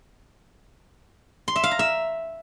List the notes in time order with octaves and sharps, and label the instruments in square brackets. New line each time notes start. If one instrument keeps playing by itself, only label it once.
[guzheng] C6
E5
F5
A#5
E5